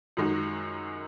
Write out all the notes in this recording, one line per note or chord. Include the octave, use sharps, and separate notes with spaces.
F#2 D#3 G#3 D#4 F#4